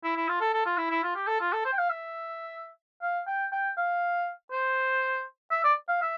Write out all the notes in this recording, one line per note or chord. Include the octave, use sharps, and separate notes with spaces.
E4
E4
F4
A4
A4
F4
E4
E4
F4
G4
A4
F4
A4
C5
G5
F5
E5
F5
G5
G5
F5
C5
E5
D5
F5
E5